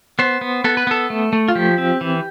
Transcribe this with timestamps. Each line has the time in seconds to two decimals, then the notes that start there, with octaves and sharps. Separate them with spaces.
0.19 B3 C5
0.41 B3
0.64 B3 A4
0.77 B4
0.87 B3 A4
1.10 A3
1.33 A3
1.48 F4
1.55 F3 G4
1.78 C4
2.01 E3